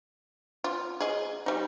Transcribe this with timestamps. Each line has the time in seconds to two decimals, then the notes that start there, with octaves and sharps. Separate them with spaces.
0.64 F4
1.00 G#4 D#5
1.46 G3 D#4